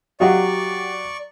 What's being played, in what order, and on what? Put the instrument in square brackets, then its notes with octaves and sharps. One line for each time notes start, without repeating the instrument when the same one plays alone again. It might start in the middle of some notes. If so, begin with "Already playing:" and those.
[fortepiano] F#3 D#5 F5 [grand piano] G4 F#5 [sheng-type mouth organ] D5 C#6